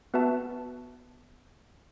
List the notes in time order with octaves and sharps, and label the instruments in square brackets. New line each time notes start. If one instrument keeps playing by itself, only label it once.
[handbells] B3 F#4 B4 E5 A5